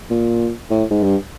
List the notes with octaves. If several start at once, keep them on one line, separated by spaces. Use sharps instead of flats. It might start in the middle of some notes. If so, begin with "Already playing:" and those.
A#2
A2
G#2
G2